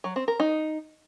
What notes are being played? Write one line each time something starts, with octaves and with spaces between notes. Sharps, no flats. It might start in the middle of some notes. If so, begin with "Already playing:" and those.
F#3
C4
A#4
D#4